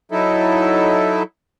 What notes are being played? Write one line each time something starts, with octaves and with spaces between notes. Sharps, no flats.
F#3 D#4 E4 A4